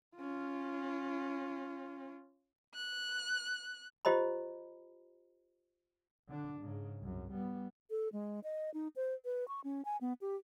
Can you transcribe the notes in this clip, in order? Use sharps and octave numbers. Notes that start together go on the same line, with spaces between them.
C#4 F4
F#6
F4 G4 C5 D#5 A#5 B5
D3 D4
G#2 C#3
C2 F#2
G3 B3
A4
G#3
D#5
D#4
C5
B4
C#6
C#4
G#5
B3
G4